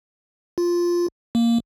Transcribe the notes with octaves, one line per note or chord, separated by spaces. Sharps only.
F4
A#3